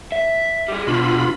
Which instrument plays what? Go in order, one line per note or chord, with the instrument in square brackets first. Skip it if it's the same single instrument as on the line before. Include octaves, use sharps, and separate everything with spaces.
[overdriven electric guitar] E5
G3 G#4
[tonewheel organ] B2 F4 B5 [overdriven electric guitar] E3 D4